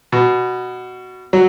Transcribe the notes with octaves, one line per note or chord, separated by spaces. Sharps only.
B2
F#3